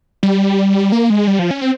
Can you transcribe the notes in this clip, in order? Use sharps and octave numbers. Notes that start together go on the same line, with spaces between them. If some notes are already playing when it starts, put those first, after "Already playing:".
G3
A#3
G#3
G3
F3
C#4
C4